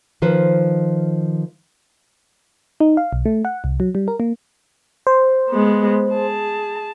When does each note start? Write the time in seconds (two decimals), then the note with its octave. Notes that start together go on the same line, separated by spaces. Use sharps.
0.22 D#3 F3 B4 C5
2.80 D#4
2.97 F5
3.13 B1
3.25 A3
3.45 F#5
3.64 C2
3.80 F#3
3.95 G3
4.08 A#4
4.20 A#3
5.07 C5
5.50 G#3 B3
6.10 G#4 A5